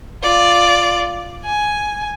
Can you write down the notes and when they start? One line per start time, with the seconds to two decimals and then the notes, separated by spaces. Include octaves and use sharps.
0.23 F4 D5
1.45 G#5